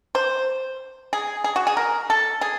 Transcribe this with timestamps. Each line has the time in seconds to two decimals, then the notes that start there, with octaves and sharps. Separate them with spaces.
0.15 C5
1.13 G#4
1.44 G#4
1.56 F#4
1.67 G#4
1.77 A#4
2.10 A4
2.41 G#4